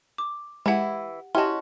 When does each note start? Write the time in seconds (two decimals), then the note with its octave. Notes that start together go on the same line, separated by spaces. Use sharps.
0.18 D6
0.66 E3 G#3 E4 G4 F#5
1.35 C#4 E4 F#4 G4 D#5 A5 C6